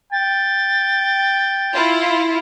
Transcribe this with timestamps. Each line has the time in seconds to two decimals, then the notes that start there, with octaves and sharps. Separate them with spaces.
0.12 G5 A6
1.74 E4 F4